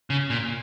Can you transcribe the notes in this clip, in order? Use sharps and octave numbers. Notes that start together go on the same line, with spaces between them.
C#3
A#2